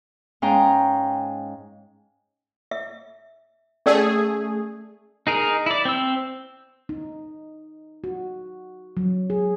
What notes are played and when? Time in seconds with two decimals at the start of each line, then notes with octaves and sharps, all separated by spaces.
0.42 G#2 C#4 F5 G5 A#5
2.71 E5
3.86 A3 C#4 G#4 D5 E6
5.27 D#4 G#4 A#4
5.66 E4 D5
5.85 C4 E6
6.89 D#4
8.04 F#4
8.97 F#3
9.30 G#4